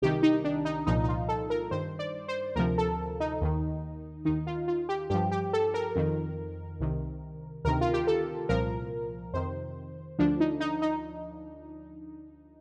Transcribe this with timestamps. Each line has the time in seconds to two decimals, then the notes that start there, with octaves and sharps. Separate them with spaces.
0.02 C2 C3 D#3 G4
0.23 D#4
0.44 D4
0.65 D#4
0.87 C2 A#2 F3 D#4
1.04 D#4
1.09 F4
1.29 A4
1.50 A#4
1.71 G2 D#3 C5
1.99 D5
2.28 C5
2.56 D2 C3 F3 A#4
2.78 A4
3.20 D#4
3.41 D#2 D#3
4.25 D#2 D#3 D#4
4.47 F4
4.68 F4
4.89 G4
5.10 G2 F3 G4
5.31 G4
5.53 A4
5.74 A#4
5.96 F2 D#3
6.80 C2 C3 D#3
7.65 D2 C3 D#3 A#4
7.81 F4
7.93 G4
8.07 A4
8.49 C2 A#2 F3 A#4
9.33 F2 C3 D#3 C5
10.19 D2 D3 F3 D4
10.40 D#4
10.60 D#4
10.82 D#4